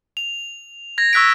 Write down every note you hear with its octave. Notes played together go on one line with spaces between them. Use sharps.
F7
G#6 A#6
C#6 E6 F#6 B6 D7